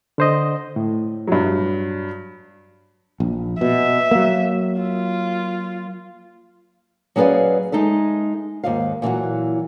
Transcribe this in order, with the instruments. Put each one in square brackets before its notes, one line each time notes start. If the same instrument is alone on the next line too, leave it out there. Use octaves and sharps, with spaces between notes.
[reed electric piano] D3 C5 D#5
A2
[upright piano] G2 F#3
[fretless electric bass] A#1
[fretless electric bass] B2 [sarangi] E5
[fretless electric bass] F#3 A#3
[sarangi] F4
[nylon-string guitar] F#3 C#4 G#4 B4 D5 F5
G#3 D#4 A4 E5
D#2 G#2 F5
A#2 E3 F#3 F#4